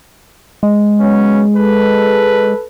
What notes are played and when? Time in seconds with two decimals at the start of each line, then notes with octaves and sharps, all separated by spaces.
0.63 G#3
0.99 F#3 B3 C#4
1.55 A4 B4